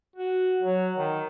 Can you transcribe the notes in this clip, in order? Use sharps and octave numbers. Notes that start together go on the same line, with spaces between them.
F#4
F#3
D#3